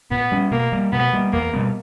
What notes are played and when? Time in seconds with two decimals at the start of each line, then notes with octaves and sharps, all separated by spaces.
0.11 A#2 B3
0.32 G3 C#4
0.51 B2 A#3
0.72 G3 A#3
0.92 B2 B3
1.13 G3 A#3
1.33 E2 A#3
1.53 B2 G3 B3